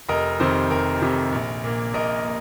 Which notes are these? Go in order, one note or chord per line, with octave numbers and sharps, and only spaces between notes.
F1 A#4 D#5
F2 C3 D#3 C5
F1 A#4
F2 C3 D#3
A#1
A#2 A#3
A#1 A#4 D#5
A#3